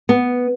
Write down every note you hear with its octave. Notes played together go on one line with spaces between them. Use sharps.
B3